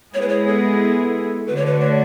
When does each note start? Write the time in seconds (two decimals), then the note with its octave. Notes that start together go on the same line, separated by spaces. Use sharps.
0.14 G#3 B3 E4 G#4 C#5
0.21 B4
0.29 C#5
0.47 A4
1.47 D3 A3 D4 F#4 B4
1.56 C#5
1.66 B4
1.80 C#5